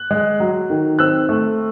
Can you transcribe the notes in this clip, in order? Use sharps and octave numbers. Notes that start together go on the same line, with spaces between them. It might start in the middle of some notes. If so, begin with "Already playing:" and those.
Already playing: F#6
G#3
F#3
D#3
C4 E6 F#6
A3